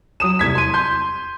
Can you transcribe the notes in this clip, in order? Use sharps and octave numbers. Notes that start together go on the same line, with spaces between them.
F#3 D#6 E7
C2 G#6 B6
C6 D#7
C6 G6